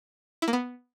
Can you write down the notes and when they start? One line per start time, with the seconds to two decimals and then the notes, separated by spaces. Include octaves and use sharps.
0.42 E4
0.48 A#3
0.53 B3